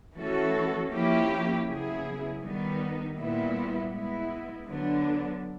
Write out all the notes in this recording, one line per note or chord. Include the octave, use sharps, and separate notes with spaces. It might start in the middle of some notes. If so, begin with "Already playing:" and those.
E3 A3 C#4 F#4 A4
F3 A#3 C#4 E4 G4
C#3 F#3 B3 E4 G#4
D#3 G3 B3 D#4
A#2 G3 B3 E4
G#3 B3 E4
D3 F#3 B3 D4